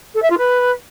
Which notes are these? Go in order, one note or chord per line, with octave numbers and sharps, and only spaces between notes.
A4
E5
F4
B4